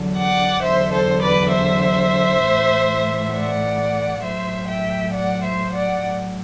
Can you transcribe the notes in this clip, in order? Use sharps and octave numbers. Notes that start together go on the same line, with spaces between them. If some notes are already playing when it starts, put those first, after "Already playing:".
Already playing: E2 D3 F#3
D5 F#5
E2 D3 F#3 C5 E5
A4 C5
B4 D5
C5 E5
A2 E3
D5 F#5
A2 F#3 C5 E5
E5 G5
D5 F#5
C5 E5
D5 F#5
A2 F#3